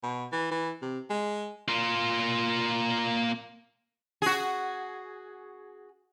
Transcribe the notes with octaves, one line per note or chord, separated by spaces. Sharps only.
B2
E3
E3
C3
G#3
A#3 F4
F#4 G#4